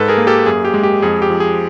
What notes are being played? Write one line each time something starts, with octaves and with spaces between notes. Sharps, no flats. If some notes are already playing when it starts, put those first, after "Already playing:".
Already playing: G#2 A4 B4
G#4 A#4
A#3
G4 A4
F#2 G#4
G4
G#3
G4
F2 G#4
G4
F3
G#4